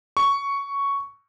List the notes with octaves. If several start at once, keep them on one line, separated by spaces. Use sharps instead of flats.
C#6